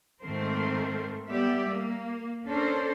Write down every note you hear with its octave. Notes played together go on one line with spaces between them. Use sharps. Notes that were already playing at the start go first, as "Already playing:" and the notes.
G#2 D#3 A3 C4 A#4 C5
G3 B3 G4 D5 E5
A#3
C#4 D4 A4 A#4 C5